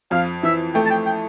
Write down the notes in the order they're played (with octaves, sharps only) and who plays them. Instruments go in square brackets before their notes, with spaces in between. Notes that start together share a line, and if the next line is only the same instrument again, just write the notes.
[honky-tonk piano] F2 [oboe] F5
[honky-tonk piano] E3 [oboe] E5
[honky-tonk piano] A3 [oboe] G5
[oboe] A5
G5
G5